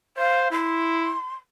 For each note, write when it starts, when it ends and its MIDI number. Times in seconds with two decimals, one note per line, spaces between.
0.17 0.50 72
0.17 0.49 77
0.51 1.16 64
0.51 1.34 84